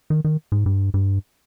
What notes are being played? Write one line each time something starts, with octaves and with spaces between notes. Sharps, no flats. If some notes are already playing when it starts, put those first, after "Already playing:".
D#3
D#3
G#2
G2
G2